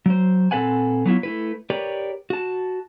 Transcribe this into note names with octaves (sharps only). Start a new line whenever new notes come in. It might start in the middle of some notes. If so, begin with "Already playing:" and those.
F#3 C5
A#2 C4 A4 B4 F#5 G#5
F#3 B3 E4 F4
A3 E4 B4
G4 A#4 B4 C#5 D5
F#4 A5